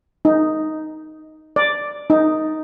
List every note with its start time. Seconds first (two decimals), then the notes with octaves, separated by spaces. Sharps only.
0.25 D#4
1.56 D5
2.10 D#4